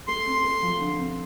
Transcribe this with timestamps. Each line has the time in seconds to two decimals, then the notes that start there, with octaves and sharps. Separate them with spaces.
0.07 A3 C6
0.26 C4
0.43 A3
0.62 F3
0.81 D3
0.98 C4